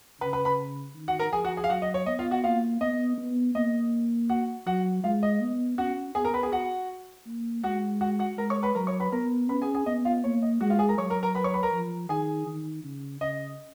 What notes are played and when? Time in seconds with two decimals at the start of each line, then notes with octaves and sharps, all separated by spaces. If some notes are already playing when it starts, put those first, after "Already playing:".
0.21 C#3 B4 B5
0.33 B4 B5
0.45 B4 B5
0.95 D#3
1.08 F#4 F#5
1.19 A#4 A#5
1.33 F3 G#4 G#5
1.44 F#4 F#5
1.57 G#4 G#5
1.64 F5
1.70 F#3 F#4 F#5
1.82 D#5
1.94 C#5
2.06 B3 D#5
2.19 F4 F5
2.31 F#4 F#5
2.44 A#3 F4 F5
2.81 B3 D#5
3.18 B3
3.55 A#3 D#5
4.30 F#4 F#5
4.66 F#3 F#4 F#5
5.04 G#3 F4 F5
5.23 D#5
5.41 B3
5.78 C#4 F#4 F#5
6.15 B3 G#4 G#5
6.25 A#4 A#5
6.34 B4 B5
6.43 G#4 G#5
6.52 F#4 F#5
7.26 A#3
7.63 G#3 F#4 F#5
8.01 F#4 F#5
8.19 F#4 F#5
8.38 G#3 A#4 A#5
8.50 C#5 C#6
8.63 B4 B5
8.75 F#3 A#4 A#5
8.87 C#5 C#6
9.00 B4 B5
9.12 B3 A#4 A#5
9.49 C#4 B4 B5
9.62 G#4 G#5
9.75 G#4 G#5
9.86 B3 D#5
10.05 F4 F5
10.24 A#3 C#5
10.42 D#5
10.61 G#3 F#4 F#5
10.70 F4 F5
10.79 G#4 G#5
10.89 A#4 A#5
10.98 F#3 C#5 C#6
11.10 A#4 A#5
11.23 A#4 A#5
11.35 B4 B5
11.44 C#5 C#6
11.54 B4 B5
11.63 A#4 A#5
11.72 F3
12.09 D#3 G#4 G#5
12.47 D#3
12.84 C#3
13.21 C#3 D#5